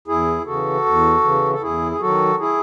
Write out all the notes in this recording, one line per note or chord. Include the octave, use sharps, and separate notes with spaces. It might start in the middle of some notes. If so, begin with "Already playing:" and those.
E2 E4 G#4
C#3 E3 F#4 A4
E2
C#3 E3
A4
E2 E4 G#4
G#4
D#3 F#3 F#4 A4
E4 G#4